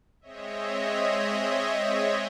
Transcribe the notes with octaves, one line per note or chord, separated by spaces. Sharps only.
G#3 C4 C#5 D#5 E5